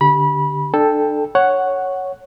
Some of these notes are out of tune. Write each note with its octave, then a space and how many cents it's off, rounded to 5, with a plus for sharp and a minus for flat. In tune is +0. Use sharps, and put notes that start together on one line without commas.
D3 +0 G4 +0 B5 -25
D4 +30 A4 +0 G5 +10
C#5 +0 F#5 +5